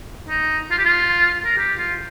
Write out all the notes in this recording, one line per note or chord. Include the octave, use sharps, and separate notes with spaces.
D#4
F4
G4
F4
A#4
G4
F4